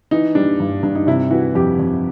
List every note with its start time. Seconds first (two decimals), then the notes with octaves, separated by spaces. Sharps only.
0.11 E3 D#4
0.35 G3 D4
0.60 G2
0.83 G2 D4
0.95 D#4
1.07 C3 E4
1.31 E3 F#4
1.55 F2 G4
1.79 F2